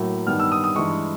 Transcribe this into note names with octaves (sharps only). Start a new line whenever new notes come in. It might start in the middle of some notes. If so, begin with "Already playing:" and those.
Already playing: A2 F#3 A#3
G2 D#3 G3 B3 F6
E6
D#6
D#6
G2 E3 G#3 C#6